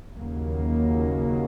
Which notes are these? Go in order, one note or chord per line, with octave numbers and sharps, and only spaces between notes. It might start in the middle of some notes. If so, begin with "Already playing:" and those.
D#2 C#3 F#3 A#3